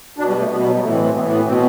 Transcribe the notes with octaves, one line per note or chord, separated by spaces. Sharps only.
B2 D4
G3
A3
B2 B3
G3
F#3
G3
A2 E3 A3
C4
C4
A2 E3 B3
B3
B2 C4